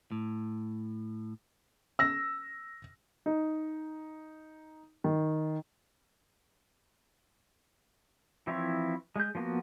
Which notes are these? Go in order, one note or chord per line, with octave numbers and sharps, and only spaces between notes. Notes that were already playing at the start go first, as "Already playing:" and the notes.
A2
E6 A#6
D#4
D#3
E3 F3 C4 E4 C#5
G#3 G6
F3 A#3 B3 F#4